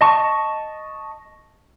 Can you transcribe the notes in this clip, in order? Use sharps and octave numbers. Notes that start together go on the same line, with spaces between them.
D#5 A5 C#6